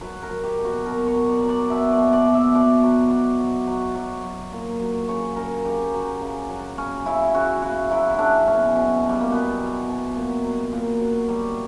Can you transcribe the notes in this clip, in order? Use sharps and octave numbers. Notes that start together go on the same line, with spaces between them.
F#3 B4
A#4
F#3
G4
B2
F#4
B2 A#4
C#5
F#3
D5
F#3
D5
B2 E5
D5
B2
D5
B2
E5
B2 D5
F#3
F#3
F#3
F#3
F#3
F#3
A#2
F#3
C#3 C#5
C#3 A#4
C#3 G4
F#3
C#3
F#3
C#3 C#4
C#3 E4
C#3 F#4
C#3 F#4
F#3 E4
C#3 D4 E4
B2 C#4
B2
B2
G3
A#3
B2 B3
F#3
B2
A#2
F#3
A#2
F#3
F#3 G3